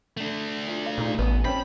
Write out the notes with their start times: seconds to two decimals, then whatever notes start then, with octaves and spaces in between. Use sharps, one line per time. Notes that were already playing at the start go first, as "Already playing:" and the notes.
0.17 A3 D4
0.68 F4
0.86 F5
0.98 A#2 D#4 G#4
1.19 A1 B3 G#5
1.45 C4 C#4 A5 B5